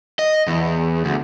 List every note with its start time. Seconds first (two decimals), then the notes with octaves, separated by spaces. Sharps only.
0.19 D#5
0.47 E2
1.05 D2